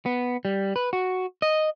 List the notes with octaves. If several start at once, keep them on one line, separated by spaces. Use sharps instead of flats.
B3
G3
B4
F#4
D#5